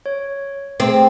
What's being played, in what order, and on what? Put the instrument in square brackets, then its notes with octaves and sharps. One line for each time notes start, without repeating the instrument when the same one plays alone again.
[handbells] C#5
[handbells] A3 G#4 [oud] C4